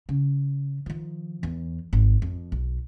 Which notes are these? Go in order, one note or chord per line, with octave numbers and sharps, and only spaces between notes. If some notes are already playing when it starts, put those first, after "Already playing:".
C#3
D#3 F3
E2
G#1
F2
B1